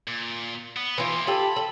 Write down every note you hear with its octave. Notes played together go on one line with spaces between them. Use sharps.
A#2
B3
E3 A#3 F4 G4
F4 G4 A4 B5
A4